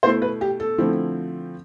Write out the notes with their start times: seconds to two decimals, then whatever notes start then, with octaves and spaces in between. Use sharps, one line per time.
0.03 B2 A3 E4 C5
0.22 B4
0.41 G4
0.60 A4
0.78 D3 F3 A3 C4 E4